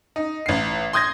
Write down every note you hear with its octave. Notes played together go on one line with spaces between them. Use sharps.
D#4
A1 C7
C6 D#6 G6 G#6 A#6